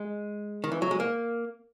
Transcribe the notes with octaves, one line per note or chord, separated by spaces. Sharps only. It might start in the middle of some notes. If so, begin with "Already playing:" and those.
Already playing: G#3
D#3
E3
F#3
G#3
A#3